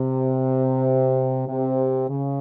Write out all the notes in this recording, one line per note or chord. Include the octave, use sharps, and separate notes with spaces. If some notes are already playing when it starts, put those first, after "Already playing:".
Already playing: C3
C3
C#3